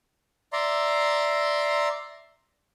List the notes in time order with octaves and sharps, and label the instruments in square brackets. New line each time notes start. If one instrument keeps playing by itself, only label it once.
[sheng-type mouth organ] D5 E5 A#5 C6